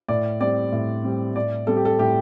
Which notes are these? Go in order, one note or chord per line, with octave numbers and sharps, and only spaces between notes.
A2 D5
G3 C4 D5
A2
G3 C4
A2 D5
G3 C4 A4
G4
A4
A2 G4